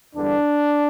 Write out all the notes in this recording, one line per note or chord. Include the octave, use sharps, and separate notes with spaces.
E2 D3 G3 D4